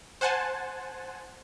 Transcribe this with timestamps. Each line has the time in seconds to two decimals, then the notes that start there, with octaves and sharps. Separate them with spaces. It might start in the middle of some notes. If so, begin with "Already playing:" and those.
0.21 C5 F#5 G#5 A5